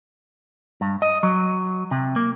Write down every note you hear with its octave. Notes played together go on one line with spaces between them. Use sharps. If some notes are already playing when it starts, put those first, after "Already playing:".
G2
D#5
F#3
C3
A#3